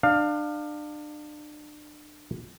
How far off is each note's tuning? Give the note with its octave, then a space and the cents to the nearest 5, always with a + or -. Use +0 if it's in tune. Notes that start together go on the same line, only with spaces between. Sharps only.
D4 +30 F5 +10